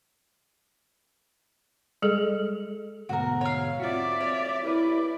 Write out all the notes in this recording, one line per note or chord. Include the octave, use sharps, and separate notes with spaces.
G3 G#3 G#4 A4
D2 G#2 B2 F#4 A#4
C#5 F5
C4 F4 F#4 D5 E5
C#5
E4 G4 A#4 B4 D5